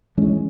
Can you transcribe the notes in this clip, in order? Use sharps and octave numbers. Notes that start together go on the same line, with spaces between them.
E3 G#3 C#4